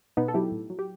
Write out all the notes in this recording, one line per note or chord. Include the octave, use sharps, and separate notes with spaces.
B2 B3 D#4
A4
F#3 E4 G4
A2
F#3
G4